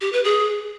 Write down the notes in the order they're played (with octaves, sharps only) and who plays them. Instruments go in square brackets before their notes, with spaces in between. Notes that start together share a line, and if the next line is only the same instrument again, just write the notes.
[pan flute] G4
B4
G#4